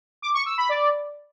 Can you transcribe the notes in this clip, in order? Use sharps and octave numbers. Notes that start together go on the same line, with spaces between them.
D6
C#6
E6
B5
D5